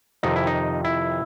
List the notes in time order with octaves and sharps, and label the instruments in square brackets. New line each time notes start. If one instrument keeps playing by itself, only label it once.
[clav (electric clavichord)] F2 C3 D#3 D#4
E4
D#4
E4